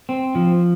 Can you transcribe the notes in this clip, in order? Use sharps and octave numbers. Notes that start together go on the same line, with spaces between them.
C4
F3